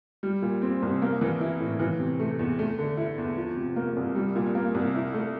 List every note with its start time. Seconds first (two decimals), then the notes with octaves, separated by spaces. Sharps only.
0.23 G3
0.42 A#2
0.62 C4
0.82 C2
1.02 A#3
1.21 E3
1.41 E4
1.60 A2
1.80 E3
2.00 C3
2.20 A3
2.39 E2
2.59 A3
2.79 D3
2.97 E4
3.18 E2
3.37 F3
3.57 C3
3.76 A#3
3.96 C2
4.15 G3
4.35 A#2
4.55 A#3
4.75 C2
4.94 E4
5.14 A3